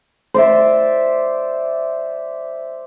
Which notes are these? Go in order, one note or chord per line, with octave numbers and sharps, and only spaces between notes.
C5 D5 E5